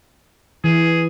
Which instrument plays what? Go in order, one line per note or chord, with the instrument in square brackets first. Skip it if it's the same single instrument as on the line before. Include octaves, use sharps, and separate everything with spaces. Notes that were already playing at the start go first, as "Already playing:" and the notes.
[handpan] E3 [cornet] G#4